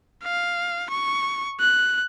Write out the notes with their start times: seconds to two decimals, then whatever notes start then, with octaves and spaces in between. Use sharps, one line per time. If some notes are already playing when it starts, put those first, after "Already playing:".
0.24 F5
0.90 C#6
1.60 F#6